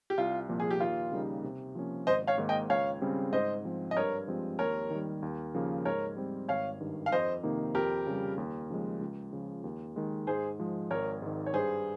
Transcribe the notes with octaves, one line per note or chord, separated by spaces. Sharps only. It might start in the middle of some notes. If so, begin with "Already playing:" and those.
G4
C2 F4
A#2 F3 A#3
G#4
G4
D#2 F4
C#3 G3 A#3 D#4
C3
F3 A#3 C#4
G#1 C5 D#5
C#5 F5
G#2 D#3 A#3
D#5 G5
C#2 C#5 F5
C#3 G3 C4
G#2 C5 D#5
F3 C4
D#5
G2 A#4 C#5
F3 G#3 C4 G4
D#2 A#4 C#5
D#3 G3
D#2
C#3 F3 A#3
G#2 A#4 C#5
G3 C4
G#1 C#5 F5
G2 D#3
F5
F2 C5 D#5
C3 D#3 A#3 D#4
F2 G4 A#4
C#3 G3
D#2
C#3 F3 G#3
C#2
C#3 F3
D#2
D#3 G#3
G#2 G#4 C5
F3 G#3
G#1 A#4 C#5
G#2 D#3
C#5
G2 G#4 C5